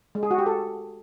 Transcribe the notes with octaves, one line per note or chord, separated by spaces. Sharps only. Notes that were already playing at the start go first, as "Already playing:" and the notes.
G#3
G#4
F#4
G4
A4